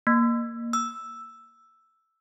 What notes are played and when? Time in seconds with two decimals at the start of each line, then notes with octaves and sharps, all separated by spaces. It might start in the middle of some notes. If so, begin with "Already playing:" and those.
0.07 A#3
0.73 E6